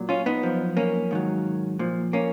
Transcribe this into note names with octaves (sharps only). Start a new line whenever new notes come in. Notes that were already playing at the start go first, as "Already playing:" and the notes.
Already playing: A#2 F#3
C#4 F4
B3 D#4
F#2 F3
A#3 C#4
G#2 D#3 F#3
A#2 F3
A#3 C#4